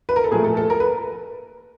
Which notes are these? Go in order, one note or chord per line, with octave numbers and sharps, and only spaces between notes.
B4
A#4
A4
A#2 F3 A3 G#4
A4
A4
A#4
B4